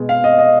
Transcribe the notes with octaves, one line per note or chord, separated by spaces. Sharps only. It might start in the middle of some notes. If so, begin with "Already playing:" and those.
Already playing: B2 G#3
F5
D#5
D#5